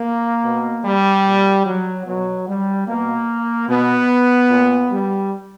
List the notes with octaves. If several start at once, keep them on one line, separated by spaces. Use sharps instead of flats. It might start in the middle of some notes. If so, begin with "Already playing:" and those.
Already playing: A#3
B2
G3
A#2
F#3
B2 F#3
G3
B2 A#3
B2 B3
A#2
G3